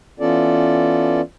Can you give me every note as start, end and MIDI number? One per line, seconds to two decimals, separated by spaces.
0.20 1.21 52
0.20 1.21 59
0.20 1.21 61
0.20 1.21 65
0.20 1.21 69
0.20 1.21 74